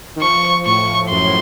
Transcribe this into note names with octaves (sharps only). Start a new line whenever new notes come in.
D#3
F3 C#6
A2 C#6
F#2 C6
A2